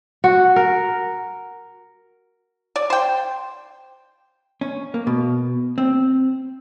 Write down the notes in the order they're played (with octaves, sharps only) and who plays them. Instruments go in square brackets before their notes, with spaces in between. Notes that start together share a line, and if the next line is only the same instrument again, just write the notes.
[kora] F#4
A#4
[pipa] D5
C5 G5
[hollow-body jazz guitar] C#4
A#3
B2
C4